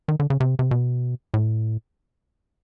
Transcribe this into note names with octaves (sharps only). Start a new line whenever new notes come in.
D#3
D3
C#3
C3
C3
B2
A2